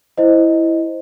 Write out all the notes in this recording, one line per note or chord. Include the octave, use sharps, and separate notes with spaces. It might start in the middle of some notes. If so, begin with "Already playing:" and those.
E4 C5 D#5